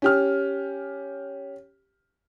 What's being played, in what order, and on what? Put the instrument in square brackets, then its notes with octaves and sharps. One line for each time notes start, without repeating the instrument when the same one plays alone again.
[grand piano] C#4 G4 F6